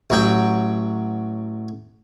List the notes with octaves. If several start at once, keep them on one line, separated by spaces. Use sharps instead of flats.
A1 F#3 G5